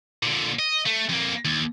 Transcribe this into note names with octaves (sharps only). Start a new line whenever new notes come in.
A#2 D3
D#5
A3
F2 A#3
D#2